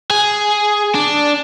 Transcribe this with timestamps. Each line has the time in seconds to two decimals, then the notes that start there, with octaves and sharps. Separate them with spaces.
0.10 G#4
0.95 D4